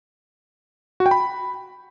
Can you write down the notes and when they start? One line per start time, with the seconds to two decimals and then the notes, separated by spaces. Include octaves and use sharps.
1.00 F#4
1.06 G5
1.11 B5